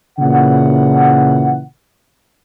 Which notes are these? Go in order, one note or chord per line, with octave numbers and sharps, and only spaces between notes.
A#2 C#3 E3 F#5